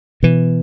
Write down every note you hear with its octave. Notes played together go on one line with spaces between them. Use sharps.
B2 E3